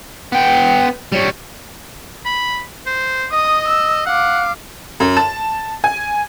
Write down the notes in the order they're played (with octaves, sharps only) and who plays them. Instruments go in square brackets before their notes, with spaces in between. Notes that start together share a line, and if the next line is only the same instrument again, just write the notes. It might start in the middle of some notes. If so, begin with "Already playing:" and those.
[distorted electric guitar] B3 G5
G3 C#5
[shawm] B5
C5
[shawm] D#5 [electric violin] D#6
[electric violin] E6
[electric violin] F5 D6 [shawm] F#5
[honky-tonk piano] F#2
A5
G#5